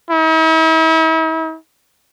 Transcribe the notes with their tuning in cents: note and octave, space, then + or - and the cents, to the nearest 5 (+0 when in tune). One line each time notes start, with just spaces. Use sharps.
E4 -45